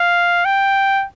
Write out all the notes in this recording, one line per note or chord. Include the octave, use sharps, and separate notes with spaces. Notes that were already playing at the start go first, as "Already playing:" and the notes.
Already playing: F5
G5